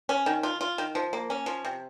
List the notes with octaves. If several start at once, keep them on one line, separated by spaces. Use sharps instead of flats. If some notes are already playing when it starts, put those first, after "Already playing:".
C#4
D#3
F4
F4
D#3
F3
A#3
C#4
F3
C3